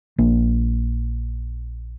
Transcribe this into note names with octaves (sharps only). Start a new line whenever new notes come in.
A#1 A#3 D4